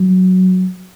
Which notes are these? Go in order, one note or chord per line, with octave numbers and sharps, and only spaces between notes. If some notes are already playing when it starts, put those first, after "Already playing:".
Already playing: F#3